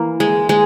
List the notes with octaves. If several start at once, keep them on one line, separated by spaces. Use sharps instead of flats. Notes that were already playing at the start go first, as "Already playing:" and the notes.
Already playing: E3 A#3
G#3
G#3